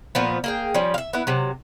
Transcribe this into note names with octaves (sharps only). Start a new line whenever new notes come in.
A#2 F3 B3
A#3 G#4 G5
F3 G3 C#4
E5 F5
B3 E4
C3 F#3